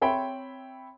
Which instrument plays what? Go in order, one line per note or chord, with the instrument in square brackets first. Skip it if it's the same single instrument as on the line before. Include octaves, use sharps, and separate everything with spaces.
[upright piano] C4 C#5 E5 G5 B5 C6